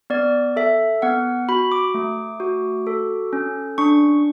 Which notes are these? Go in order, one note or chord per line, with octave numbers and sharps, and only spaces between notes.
B3 D5
A4 E5
B3 F#5
F#4 B5
D6
A3
F#4
A4
C#4
D4 C#6